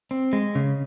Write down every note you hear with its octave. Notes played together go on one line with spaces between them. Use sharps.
C4
G#3
C#3